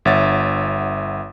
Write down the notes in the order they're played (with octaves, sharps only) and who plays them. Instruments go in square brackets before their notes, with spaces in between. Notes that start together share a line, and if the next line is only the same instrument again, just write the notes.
[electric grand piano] G1 C#5 E5 F#5 A6